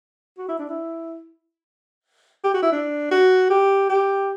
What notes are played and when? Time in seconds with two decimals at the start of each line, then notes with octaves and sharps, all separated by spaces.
0.38 F#4
0.48 E4
0.59 D4
0.69 E4
2.44 G4
2.54 F#4
2.62 E4
2.72 D4
3.11 F#4
3.50 G4
3.89 G4